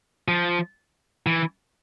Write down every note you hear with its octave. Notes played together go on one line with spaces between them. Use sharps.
F3
E3